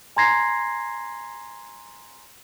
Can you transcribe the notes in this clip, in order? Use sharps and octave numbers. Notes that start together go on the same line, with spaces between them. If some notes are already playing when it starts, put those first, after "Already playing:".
G#5 A#5 C6 G#6 A#6 C7